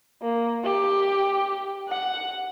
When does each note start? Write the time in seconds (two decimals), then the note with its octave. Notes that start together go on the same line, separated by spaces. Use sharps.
0.22 A#3
0.64 G4
1.89 F#5